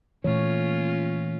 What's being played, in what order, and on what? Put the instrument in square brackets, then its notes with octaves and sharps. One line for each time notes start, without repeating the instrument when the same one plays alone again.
[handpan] A#2 A3 C#5 [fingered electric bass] E3 [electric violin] C#4 F4